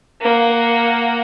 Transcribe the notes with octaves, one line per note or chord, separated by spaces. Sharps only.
A#3 F#5